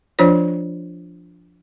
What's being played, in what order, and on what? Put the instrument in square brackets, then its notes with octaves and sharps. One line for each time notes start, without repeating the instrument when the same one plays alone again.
[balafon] F3 D4 F4 C5 C#5